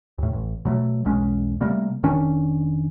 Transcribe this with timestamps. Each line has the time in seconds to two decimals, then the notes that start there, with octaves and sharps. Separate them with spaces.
0.18 D#2 A2
0.33 A1
0.65 B2 F#3 A3
1.05 E1 B1 G#3 C#4
1.61 C3 G3 A3 A#3
2.03 F1 D#3 C#4 D4